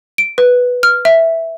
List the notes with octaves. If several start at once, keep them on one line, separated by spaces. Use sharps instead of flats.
D7
B4
F6
E5